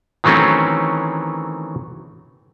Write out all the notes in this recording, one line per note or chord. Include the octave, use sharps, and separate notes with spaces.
D#3 E3 F#3 A3 C4 C#4